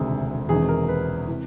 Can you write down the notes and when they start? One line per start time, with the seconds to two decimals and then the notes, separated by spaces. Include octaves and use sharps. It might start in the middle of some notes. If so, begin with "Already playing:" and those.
Already playing: E1 D2 C3 D#3 G#4
0.49 E1 E2 C3 D#3 G#4
0.69 A#4
0.88 B4
1.28 C3 E3